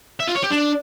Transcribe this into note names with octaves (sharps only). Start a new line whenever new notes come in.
E5
F4
C#5
G4
D4